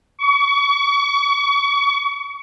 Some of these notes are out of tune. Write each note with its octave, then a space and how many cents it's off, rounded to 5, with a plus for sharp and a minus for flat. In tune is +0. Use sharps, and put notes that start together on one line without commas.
C#6 +35